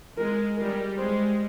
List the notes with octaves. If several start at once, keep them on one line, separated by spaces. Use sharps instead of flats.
G#3 A#4
G3 A#4
G#3 C5